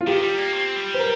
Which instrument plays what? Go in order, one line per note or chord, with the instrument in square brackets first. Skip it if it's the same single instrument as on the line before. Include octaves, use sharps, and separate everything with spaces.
[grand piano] F4
[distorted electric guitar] D#3 [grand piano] G4
[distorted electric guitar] G3
A#3
C4
G3
[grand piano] C5
A#4